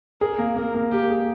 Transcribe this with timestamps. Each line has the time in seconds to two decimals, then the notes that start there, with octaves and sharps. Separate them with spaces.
0.21 G#4 A#4
0.38 A#3
0.56 A#3 A#4
0.74 A#3
0.92 A#3 G4
1.10 G#4